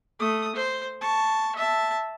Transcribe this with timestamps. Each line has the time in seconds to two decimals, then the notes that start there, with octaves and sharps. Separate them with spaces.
0.19 A3 D#6
0.56 C5
1.01 A5 C#6
1.55 E5 A5